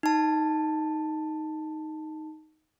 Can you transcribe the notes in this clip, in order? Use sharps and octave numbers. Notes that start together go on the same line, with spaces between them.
D#4 A5